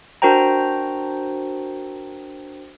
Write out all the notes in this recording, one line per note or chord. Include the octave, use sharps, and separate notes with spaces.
D4 F#4 A#4 C5 G5 A#5